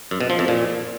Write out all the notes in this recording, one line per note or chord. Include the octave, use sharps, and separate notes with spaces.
F#2
B2
F3
F2
A#2